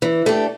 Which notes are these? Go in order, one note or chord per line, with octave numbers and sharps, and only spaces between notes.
E3
A3 D4 G4